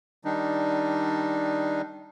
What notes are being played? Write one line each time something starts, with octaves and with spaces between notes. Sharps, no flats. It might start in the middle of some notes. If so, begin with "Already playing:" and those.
D#3 G3 D4 D#4